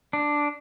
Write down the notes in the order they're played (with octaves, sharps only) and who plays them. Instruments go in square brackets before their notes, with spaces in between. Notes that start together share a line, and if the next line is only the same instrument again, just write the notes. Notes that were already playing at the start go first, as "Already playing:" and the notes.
[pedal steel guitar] D4